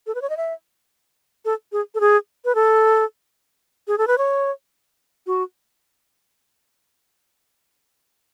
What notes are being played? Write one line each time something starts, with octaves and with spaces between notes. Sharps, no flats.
A4
B4
C#5
D#5
E5
A4
G#4
A4
G#4
B4
A4
G#4
A4
B4
C#5
F#4